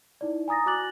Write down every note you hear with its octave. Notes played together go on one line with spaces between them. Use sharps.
D#4 E4 D5
G#5 A#5 D#6 A6 A#6
F#4 G#5 D6 F#6 A6 F#7